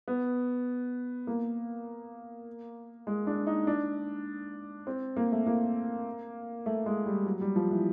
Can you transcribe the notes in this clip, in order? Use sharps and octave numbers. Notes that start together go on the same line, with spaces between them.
B3
A#3
G#3
D4
D#4
D4
C4
A#3
A3
A#3
A3
G#3
G3
F#3
G3
F3
E3